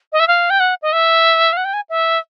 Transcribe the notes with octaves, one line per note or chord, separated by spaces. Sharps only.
D#5
E5
F5
G5
F#5
D#5
E5
F5
F#5
G5
G#5
E5